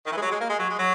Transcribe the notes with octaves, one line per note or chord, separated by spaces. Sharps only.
D#3
E3
G#3
F#3
G#3
A#3
G#3
F#3
G#3
F#3